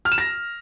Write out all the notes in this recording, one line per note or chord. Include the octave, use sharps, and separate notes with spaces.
F6
E7
A#6